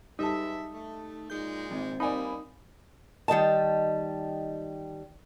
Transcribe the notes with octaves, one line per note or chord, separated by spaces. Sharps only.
G3 G#3 D#4 A4 B4 E5
A3
A#2 G#3 D#4 G6
G#1 C4
G3 A#3 D#4 D5 G#5 B5
D#3 G3 D#5 A5